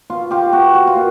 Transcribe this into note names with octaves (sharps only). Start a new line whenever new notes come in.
B2 F4
F4 G4
B2 F#4
F#4
F4
A#2